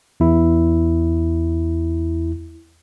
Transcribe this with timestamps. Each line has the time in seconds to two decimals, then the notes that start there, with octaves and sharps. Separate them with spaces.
0.20 E2 E4